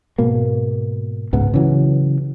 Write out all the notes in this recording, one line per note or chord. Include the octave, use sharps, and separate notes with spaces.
G#2 B2 A#3
C#2 G#2 B3
C#3 E3 F#3